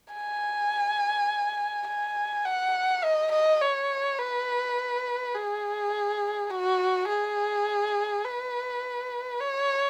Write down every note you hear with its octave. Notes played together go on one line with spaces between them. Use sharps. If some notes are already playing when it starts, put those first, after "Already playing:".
G#5
G#5
F#5
D#5
D#5
C#5
B4
G#4
F#4
G#4
B4
C#5